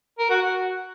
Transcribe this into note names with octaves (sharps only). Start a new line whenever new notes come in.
A#4
F#4
F#4